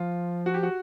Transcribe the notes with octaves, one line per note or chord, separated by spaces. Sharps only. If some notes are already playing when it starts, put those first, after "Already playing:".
Already playing: F3 F4
F#4
G4
F#4